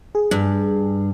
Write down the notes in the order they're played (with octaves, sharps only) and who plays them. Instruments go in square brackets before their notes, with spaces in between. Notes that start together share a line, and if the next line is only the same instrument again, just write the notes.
[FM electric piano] G#4
[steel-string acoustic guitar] G2